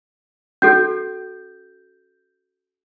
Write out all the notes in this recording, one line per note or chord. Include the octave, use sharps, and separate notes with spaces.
C#4 F#4 A4 G6